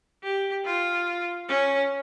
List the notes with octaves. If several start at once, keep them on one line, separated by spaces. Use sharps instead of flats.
G4
F4
C#4